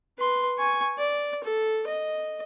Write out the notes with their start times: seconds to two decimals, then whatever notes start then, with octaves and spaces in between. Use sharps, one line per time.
0.18 B4 C6
0.58 G#5 C#6
0.98 D5
1.43 A4
1.87 D#5